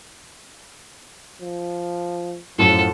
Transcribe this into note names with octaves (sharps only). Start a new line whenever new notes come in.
F3
F#2 A2 F3 A4